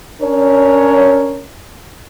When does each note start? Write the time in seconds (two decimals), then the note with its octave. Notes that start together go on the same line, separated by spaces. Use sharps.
0.21 C#4 D4 A#4 C#5